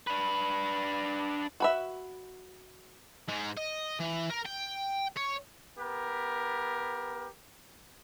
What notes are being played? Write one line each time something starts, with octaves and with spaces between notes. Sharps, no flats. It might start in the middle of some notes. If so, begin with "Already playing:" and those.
D4 B4
F#4 B4 E5
G#2 G#3
D#5
E3
A#4
G5
C#5
B3 G4 A#4